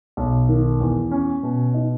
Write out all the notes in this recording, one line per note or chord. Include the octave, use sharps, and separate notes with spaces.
B1
D#3
E2
C#4
B2
D#4